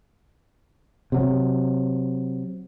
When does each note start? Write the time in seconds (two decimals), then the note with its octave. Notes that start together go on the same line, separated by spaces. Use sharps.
1.12 C3 F#3